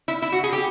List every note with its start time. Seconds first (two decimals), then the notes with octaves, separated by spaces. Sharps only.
0.08 E4
0.22 E4
0.32 F#4
0.44 G#4
0.53 G4